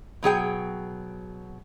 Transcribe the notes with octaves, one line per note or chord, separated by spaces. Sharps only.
B2 F#3 G#4 G5